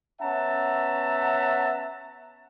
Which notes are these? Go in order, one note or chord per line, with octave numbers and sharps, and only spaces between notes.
B3 C#4 E5 F#5 A5 A#5